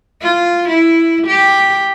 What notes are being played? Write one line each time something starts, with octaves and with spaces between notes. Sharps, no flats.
F4
E4
G4